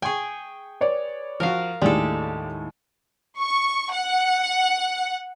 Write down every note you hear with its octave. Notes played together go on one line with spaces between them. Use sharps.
G#4 G5 G#5 C#6
B4 C#5 D5
F3 F#4 A#4 F5
D#2 A2 G#3 D4 G4 A4 D5
C#6
F#5